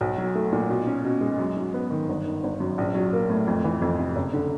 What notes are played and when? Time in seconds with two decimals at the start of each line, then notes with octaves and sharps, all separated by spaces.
0.01 B1
0.18 F#3
0.35 A3
0.52 A#2
0.70 B2
0.87 C#4
1.05 B2
1.21 G#3
1.39 F#2
1.57 F#3
1.74 B3
1.91 D#3
2.09 G1
2.25 D#3
2.44 G1
2.60 F#2
2.78 A#1
2.95 F#3
3.13 A#3
3.30 A2
3.47 F2
3.64 E3
3.82 F2
3.99 C3
4.16 F#1
4.33 D3